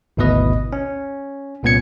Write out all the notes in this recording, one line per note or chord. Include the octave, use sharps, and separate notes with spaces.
G#1 D2 B2 E4 B4 D#5
C#4
C2 A#2 B3 C#4 G#6 C#7